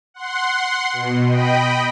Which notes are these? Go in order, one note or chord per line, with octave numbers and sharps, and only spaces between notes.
F#5 C6
B2
D#5 G5 B5